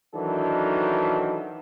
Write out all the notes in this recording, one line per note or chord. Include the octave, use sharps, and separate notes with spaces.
D#3 E3 F#3 D4 F#4 A4